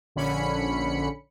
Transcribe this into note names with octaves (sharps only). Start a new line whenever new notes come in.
A#1 D3 C#4 B5 C#7